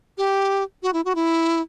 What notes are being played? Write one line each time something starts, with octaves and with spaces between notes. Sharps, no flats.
G4
F#4
E4
F#4
E4